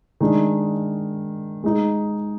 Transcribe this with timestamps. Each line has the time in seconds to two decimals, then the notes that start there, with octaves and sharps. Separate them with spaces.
0.21 D#3 G#3 D4
1.63 G#3 D#4 G#4